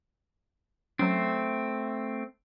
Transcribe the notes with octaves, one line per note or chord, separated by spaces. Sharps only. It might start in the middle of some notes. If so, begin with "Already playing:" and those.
F#3 A3 C4 C#4